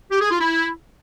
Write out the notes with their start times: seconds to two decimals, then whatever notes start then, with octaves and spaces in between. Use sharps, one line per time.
0.11 G4
0.21 G#4
0.30 F4
0.40 E4